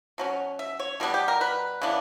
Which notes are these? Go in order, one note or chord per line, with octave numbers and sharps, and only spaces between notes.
B2 F#3 C#4
E5
C#5
B2 G3 B3 D4
G4
A#4
B4
C#3 E3 B3 D4